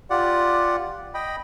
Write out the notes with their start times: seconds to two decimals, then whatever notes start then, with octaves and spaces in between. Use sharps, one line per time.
0.10 F4 G4 D5 F#5
1.14 D#5 G5 B5